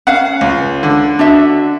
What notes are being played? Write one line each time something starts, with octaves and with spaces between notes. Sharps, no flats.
C#4 F5 F#5
C#2
D3
D4 F#4 E5